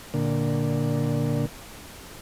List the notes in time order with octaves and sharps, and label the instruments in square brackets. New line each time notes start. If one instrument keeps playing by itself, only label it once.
[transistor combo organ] A#2 D3